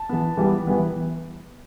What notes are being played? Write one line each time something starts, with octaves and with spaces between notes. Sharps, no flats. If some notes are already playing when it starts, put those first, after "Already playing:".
Already playing: A5
E3 B3
E3 G3 B3
E3 G3 B3